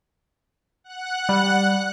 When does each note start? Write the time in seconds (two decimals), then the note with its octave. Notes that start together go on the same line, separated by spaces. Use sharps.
0.84 F#5 F#6
1.29 G3